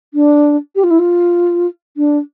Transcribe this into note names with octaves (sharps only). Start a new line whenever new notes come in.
D4
G4
F4
E4
F4
D4